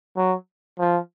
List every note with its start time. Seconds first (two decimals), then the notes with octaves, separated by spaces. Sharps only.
0.16 F#3
0.79 F3